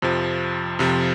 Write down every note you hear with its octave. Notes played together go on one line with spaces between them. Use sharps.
F2 C3 F3
F2 C3 F3